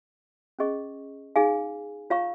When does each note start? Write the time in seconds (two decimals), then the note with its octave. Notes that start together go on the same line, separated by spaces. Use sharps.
0.59 C#4 G#4 D#5 C#6
1.36 D#4 G#4 F5 G#5
2.10 F4 C#5 F5 A#5 C#6